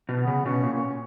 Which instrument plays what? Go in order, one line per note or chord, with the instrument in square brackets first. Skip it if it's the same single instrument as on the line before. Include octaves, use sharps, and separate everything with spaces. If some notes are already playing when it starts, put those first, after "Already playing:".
[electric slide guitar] B2
[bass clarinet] B3
[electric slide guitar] C#3
[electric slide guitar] B2 [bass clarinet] C#4
[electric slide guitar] A#2
[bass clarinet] C#4